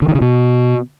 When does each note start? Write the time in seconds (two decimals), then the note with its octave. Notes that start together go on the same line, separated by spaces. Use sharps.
0.02 D3
0.08 D#3
0.15 C#3
0.21 B2